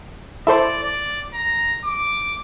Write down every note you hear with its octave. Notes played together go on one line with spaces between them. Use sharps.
E4 A4 C5 D5
D5
A#5
D6